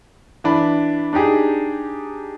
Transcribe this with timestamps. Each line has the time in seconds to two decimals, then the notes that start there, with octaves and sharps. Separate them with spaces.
0.44 E3 D4 B5
1.13 D4 D#4 G4 G#4